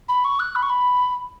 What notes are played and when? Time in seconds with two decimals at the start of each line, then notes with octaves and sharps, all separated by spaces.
0.09 B5
0.24 C#6
0.40 F#6
0.56 B5
0.63 C#6
0.70 B5